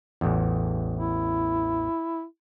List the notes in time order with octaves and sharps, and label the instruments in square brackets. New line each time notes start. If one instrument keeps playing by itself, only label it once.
[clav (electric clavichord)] A1 E2
[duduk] E4